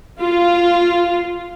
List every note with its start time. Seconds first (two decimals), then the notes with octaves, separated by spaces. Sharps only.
0.21 F4